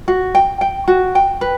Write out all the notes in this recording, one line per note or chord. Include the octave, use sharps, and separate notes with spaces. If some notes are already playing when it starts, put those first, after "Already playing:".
F#4
G5
G5
F#4
G5
B4